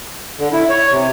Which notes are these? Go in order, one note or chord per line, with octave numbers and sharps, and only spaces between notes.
D3
E4
C#5
C3